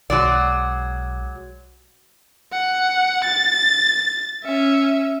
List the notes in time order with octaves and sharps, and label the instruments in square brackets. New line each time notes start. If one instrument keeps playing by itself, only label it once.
[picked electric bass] B1 [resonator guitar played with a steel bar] F#3 G#3 D5
[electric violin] F#5
A6
C#4 E5